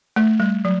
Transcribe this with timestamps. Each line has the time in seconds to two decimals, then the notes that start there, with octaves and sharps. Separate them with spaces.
0.16 A3
0.40 G3
0.65 F#3